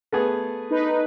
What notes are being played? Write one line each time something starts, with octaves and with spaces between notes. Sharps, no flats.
A3 B3 G#4
D#4 B4